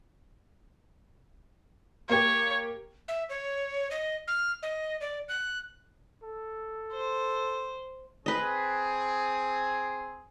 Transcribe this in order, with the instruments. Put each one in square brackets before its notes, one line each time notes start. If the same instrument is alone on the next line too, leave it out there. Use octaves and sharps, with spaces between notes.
[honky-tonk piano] A#3 G4 [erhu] C#5
[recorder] E5
C#5
D#5
F6
D#5
D5
F#6
[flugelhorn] A4
[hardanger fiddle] C5
[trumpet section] C4 G#4 [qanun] B4 D#5